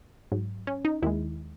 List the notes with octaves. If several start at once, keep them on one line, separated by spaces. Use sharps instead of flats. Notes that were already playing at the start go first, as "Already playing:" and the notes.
G#2 F#3
C#4
D#4
D#2 D#3 G#3 E4